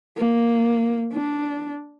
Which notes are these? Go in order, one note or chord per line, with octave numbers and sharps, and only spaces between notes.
A#3
D4